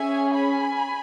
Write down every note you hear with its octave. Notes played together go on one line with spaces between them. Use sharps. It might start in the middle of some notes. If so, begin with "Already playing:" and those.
Already playing: C#4 G#4 E5 G#5
G#5 B5